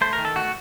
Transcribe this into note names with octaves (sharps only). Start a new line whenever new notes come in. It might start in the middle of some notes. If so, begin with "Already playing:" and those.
A3 C5
A#4
D#3
A4
A3 F#4